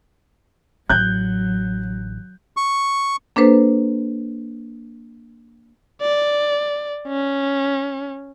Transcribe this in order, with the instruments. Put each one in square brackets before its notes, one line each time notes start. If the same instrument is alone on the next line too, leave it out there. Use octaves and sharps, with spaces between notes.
[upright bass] A1 D3 [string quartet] F#3 [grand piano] F#6 G6
[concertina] C#6
[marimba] A#3 D4 A4 B4 C5
[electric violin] D5
C#4